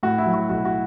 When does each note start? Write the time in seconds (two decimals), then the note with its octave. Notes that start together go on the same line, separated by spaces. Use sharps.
0.03 A2 F#4
0.18 E4
0.26 F#3
0.34 F#4
0.49 B1 F#4
0.65 F#4